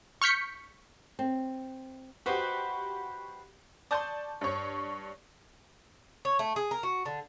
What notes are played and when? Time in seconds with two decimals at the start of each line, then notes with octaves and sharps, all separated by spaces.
0.22 C#6 F6 G6 B6 C#7
1.19 C4
2.26 F#4 G4 B4 C5 D#5
3.91 D5 A5 C6 C#6 D#6 G6
4.41 G2 C#5
6.25 C#5
6.39 A3
6.56 G#4
6.71 A#4
6.83 F#4
7.06 D3